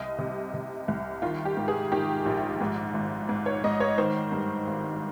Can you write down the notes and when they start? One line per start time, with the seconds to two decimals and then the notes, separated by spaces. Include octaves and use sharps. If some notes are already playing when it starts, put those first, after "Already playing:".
Already playing: C2 D#5
0.18 C3
0.54 C3
0.88 C2
1.22 D#3 F4
1.45 G4
1.57 G#2
1.68 G#4
1.92 D#3 G4
2.26 A#1
2.60 G#2
2.94 G#1
3.29 G#2
3.46 C#5
3.64 G#2 D#5
3.80 C#5
3.98 D#3 C5
4.32 G2
4.67 G#1